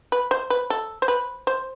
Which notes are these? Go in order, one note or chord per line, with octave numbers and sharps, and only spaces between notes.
B4
C5
B4
A4
C5
B4
C5